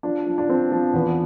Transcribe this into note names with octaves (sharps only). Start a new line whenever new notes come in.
F3 D4
F3
D4
F3 C4
F3
E2 B3